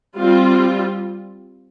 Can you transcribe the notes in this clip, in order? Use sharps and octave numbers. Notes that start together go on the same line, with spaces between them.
G3 C4 F4